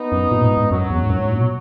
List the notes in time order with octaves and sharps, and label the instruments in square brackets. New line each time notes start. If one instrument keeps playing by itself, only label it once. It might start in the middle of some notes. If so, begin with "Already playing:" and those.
Already playing: [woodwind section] B3 D#4
[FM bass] F#2
A#2
G#2
G#2
[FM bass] F#2 [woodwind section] F#3
[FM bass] E2
G#2
F#2
G#2
A#2
B2